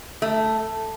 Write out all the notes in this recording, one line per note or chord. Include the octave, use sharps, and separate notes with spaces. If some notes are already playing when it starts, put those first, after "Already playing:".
A3